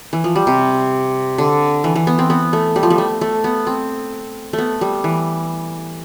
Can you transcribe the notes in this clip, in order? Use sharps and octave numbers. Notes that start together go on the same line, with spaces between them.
E3
F3
G3
C3
D3
E3
E3
B3
C4
B3
A3
G3
F3
G3
A3
A3
B3
C4
A3
B3
G3
E3